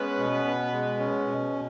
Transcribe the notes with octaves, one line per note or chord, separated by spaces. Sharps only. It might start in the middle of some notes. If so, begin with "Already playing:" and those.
Already playing: G#3 B3 C#4 B4
B2
B2
G#3
C#4
B2
B2